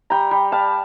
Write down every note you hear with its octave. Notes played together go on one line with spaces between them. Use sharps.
G3 G5 A#5
G3
G3 F5 A5